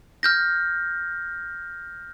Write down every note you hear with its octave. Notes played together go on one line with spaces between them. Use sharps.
F6 G6 A#6